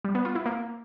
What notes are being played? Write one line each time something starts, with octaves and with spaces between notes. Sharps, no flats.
G3
B3
F4
E4
A#3